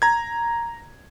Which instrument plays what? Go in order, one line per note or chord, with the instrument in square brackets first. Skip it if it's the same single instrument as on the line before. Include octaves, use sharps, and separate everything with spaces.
[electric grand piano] A#5 G#6